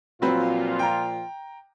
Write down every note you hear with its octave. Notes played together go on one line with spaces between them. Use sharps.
A#2 F3 F#3 C4 F4 B4
G5 A#5